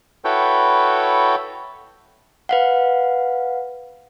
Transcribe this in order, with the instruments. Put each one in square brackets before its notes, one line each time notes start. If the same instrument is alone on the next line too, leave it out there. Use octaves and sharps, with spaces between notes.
[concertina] E4 F#4 A4 B4 C#5 G5
[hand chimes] B4 F5 F#5